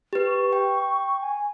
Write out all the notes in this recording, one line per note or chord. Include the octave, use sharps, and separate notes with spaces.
G4 B4
C#6
G5
G#5